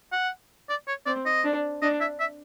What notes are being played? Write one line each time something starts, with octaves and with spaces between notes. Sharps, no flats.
F#5
D5
C#5
C4 D5
D#5
D4
D4 D#5
E5
E5